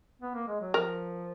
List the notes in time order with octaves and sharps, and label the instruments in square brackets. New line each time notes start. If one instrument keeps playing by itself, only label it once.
[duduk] B3
A#3
G#3
F#3
[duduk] F3 [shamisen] A#4